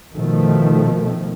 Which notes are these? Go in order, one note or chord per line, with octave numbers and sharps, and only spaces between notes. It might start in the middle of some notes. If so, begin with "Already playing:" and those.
B2 D#3 F3 A3